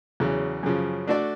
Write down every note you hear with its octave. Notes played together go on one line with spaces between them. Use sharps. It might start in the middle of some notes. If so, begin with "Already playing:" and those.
E2 C#3 F#3
F#2 C#3 F3
A3 D4 F#4 A4 D5